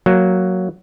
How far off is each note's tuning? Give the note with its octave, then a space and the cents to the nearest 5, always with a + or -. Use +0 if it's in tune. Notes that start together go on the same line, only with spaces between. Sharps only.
F#3 +0 A#3 -5